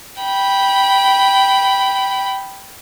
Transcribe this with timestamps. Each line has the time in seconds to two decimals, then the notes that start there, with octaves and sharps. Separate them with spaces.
0.21 G5 B5